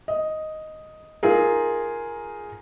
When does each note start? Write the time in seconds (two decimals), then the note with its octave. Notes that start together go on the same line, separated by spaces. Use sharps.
0.08 D#5
1.23 D#4 F4 G#4 A#4